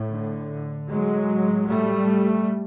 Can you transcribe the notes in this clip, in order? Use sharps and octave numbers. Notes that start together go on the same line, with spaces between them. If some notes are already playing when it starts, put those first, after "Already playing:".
Already playing: A2
D3
A2 F#3 G#3
G3 A3